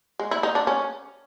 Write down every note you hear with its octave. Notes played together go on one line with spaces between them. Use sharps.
G#3
E4
D#4
D4
C#4